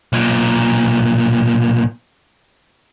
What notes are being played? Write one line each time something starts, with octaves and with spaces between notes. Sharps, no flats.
B1 A#2